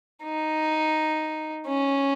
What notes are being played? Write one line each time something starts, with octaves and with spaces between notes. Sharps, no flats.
D#4
C#4